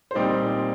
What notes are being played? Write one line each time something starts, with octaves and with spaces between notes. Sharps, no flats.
C5
A#2 G3 C4 D#4 D5